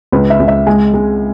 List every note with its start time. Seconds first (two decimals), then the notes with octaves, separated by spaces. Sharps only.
0.12 C#2 B4
0.30 E5
0.40 C#2
0.48 E5
0.67 G#3 G#5
0.94 G#3